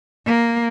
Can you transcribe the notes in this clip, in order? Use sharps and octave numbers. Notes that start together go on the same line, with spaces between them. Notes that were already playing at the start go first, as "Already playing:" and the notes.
A#3